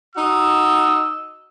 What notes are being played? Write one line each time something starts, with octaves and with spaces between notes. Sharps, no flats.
D#4 F#4 D#5 E6